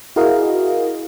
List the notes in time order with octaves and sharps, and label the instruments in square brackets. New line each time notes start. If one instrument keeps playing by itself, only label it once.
[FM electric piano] E4 F#4 G#4 A#4 D#5 F5